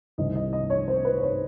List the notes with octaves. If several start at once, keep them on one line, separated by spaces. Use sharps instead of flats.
C2 C3 D#3 D#5
D#5
D#5
C#5
C5
B4
C5
C#5